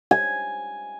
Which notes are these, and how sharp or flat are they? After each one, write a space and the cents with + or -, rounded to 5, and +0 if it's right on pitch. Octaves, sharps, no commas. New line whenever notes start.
G#5 +0